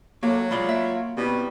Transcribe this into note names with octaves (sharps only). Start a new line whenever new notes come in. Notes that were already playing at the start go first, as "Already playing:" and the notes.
A2 F#3 A#3
G#3 F4 D5 B5 C6
A#3 E5 D7
B2 G3 B3 C4 E4